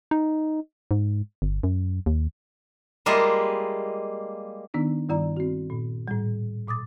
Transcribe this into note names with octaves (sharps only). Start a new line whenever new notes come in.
D#4
G#2
G1
F#2
D#2
G3 G#3 A#3 F4 D#5 E5
D#3 B3 D4 D#4
G2 D#3 G3 E4 D5 A#5
C4 F#4
A#2
A2 G3
A#2 D6 D#6 A6